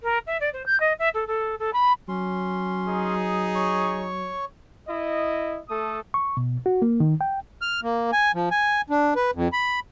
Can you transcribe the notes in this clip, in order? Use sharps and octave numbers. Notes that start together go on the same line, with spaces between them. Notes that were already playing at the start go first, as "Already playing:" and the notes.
A#4
E5
D5
C5
G6
D#5
E5
A4
A4
A4
B5
F#3 C#4 C6
D#4 G#4
C#5 C#6
E4 D#5
A3 A4 D#6
C#6
B2
F#4
A#3
D#3
G5
F6
A#3
G#5
F3
G#5
D4
B4
F2
B5